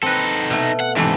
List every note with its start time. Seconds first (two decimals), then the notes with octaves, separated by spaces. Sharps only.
0.03 C4 D#4 A4 B4
0.50 B2 A3
0.80 F#5
0.96 G#2 C3 E3 A3